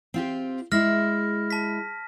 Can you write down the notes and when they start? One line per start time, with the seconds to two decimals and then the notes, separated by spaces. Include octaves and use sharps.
0.14 C4 F4 G4
0.72 G#3 E4 F6 A#6
1.50 A5 B6